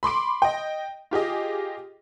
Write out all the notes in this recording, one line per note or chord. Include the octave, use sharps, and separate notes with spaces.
B5 C6 D6 D7
D#5 G5
F4 G4 G#4 D#5